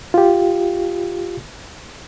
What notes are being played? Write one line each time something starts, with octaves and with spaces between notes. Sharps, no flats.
F4 G4